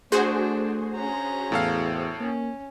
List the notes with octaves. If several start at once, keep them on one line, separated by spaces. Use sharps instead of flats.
A3 D4 F#4 G#4 C5
C#4 A#5
E2 A2 A4 F5
A#3 C#4